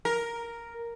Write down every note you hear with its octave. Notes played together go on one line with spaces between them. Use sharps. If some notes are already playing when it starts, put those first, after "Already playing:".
A#4